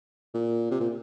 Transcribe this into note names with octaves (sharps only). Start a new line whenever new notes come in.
A#2
C3
A#2